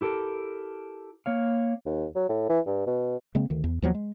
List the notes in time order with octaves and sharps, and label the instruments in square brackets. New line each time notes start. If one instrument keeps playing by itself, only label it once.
[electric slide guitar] E4 G4 A4 A#4
A#3 C#5 F5
[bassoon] D#2
F#3
A2
E3
G2
B2
[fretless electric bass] C#3 G#3 A#3 C4
D2 D#3
E2
D#2 F3 F#3 B3
G#3